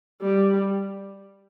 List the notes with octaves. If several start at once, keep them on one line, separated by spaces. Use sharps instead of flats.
G3